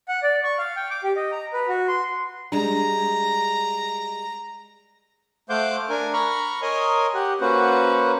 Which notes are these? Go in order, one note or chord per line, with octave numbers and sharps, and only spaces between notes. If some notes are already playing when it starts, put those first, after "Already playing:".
F#5
D5
C#6
F5
G5
D6
G4
D#5
A#5
B4
F#4
C6
G3 G#3 D4 A#5
A3 C5 F5 F#5 D6 G6
D4 A#4 G#5
A#5 B5 C#6 F6
A#4 C#5 D#5 G#5 C6 D#6
G4 F#5
A#3 C#4 F#4 B4 C5 F#5